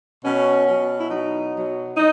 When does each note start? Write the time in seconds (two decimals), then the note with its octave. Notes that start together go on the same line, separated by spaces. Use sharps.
0.24 B2 F#3 C#4
0.66 B2 F#3
1.00 E4
1.10 B2 F#3 D#4
1.53 B2 F#3
1.97 D#4